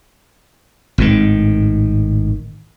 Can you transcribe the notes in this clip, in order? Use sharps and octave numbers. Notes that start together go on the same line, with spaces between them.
G#1 A2 D#3